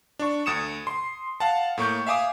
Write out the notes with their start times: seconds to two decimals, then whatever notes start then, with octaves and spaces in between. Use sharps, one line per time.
0.19 D4 C#6
0.46 D2 D#6 C#7 E7
0.87 C6
1.40 F5 F#5 A5
1.78 A2 A#3 C#6 G6
2.07 E5 F5 G#5 D6 D#6